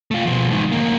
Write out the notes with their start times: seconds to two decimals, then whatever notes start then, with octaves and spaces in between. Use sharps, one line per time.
0.11 A3 F4
0.26 B2 F3
0.50 G#2 D#3
0.72 D2 A#3